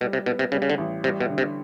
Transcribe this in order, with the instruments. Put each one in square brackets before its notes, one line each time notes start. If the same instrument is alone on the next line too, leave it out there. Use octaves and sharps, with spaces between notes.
[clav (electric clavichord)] B2 [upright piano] G3
[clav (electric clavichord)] C3
[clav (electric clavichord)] B2 [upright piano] B3
[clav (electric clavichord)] C3
[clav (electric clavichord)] C#3 [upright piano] G3
[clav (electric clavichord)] C#3
D3
[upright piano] A1
[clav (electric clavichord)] C3 [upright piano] G3
[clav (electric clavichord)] B2
[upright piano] D3
[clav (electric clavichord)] C3